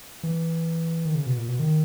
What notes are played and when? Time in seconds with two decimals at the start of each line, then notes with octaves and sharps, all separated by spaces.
0.23 E3
1.05 D#3
1.15 C#3
1.26 B2
1.37 A#2
1.48 B2
1.60 D#3